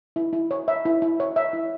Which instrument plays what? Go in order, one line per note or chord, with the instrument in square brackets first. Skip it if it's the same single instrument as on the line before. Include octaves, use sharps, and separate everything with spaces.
[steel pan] E4
E4
C#5
E5
E4
E4
C#5
E5
E4